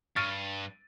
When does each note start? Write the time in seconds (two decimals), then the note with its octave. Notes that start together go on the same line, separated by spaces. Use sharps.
0.16 G2 C#6 F6 A6 D7 D#7